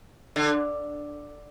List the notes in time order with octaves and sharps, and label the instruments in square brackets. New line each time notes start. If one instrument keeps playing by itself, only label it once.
[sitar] D3